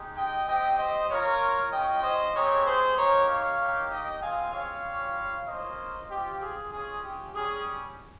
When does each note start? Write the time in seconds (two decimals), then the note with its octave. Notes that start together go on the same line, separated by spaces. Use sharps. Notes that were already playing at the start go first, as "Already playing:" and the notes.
Already playing: G#3 D#4 G4
0.17 D#5 G5
0.48 C4 G4 D#5 G5
0.79 C5 D#5
1.10 A#3 F4 A#4 C#5
1.72 G#3 C#4 F4 D#5 G5
2.04 C5 D#5
2.35 G#3 C4 G4 A#4 C#5
2.67 G#4 C5
2.97 A#3 D#4 G4 A#4 C#5
3.29 C#5 F5
3.61 A#3 D#4 G4
3.91 D#5 G5
4.23 G#3 C4 F4 F5 G#5
4.54 C#5 F5
4.85 G3 C#4 F4
5.48 A#3 C#4 F4 C5 D#5
6.10 C4 F4 G4
6.42 G#4
6.73 G#3 C#4 F4 G#4
7.04 G4
7.35 G3 C#4 G4 G#4